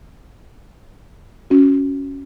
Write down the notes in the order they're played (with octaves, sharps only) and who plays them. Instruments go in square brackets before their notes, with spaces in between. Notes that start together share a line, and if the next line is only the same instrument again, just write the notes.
[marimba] C#4 F#4